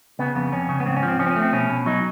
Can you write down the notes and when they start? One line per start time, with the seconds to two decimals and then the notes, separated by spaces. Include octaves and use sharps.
0.19 C#3 B3
0.36 F2 B3
0.52 F2 C#4
0.69 C#3
0.80 B3
0.86 G#2 C4
0.97 C#4
1.03 F3
1.08 C4
1.19 F3 C#4
1.26 C4
1.31 C#4
1.36 A3
1.42 C4
1.53 B2 C#4
1.69 B2
1.86 F#3 D#4